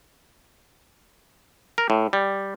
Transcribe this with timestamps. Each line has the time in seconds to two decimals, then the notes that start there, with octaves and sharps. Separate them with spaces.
1.78 A#4
1.90 A2
2.13 G3